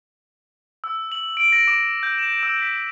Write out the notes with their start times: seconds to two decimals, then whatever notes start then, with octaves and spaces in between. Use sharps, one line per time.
0.84 E6
1.12 F#7
1.37 D7
1.52 A#6
1.68 D6
2.03 G6
2.18 E7
2.43 E6
2.62 B6